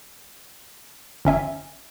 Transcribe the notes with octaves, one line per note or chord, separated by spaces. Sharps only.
G1 C#4 E5 G#5